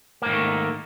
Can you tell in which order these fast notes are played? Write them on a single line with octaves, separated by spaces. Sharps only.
A#3 G#2 D#3 A3